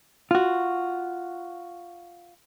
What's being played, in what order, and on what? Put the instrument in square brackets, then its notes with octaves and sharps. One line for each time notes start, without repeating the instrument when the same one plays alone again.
[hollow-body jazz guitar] F4 F#4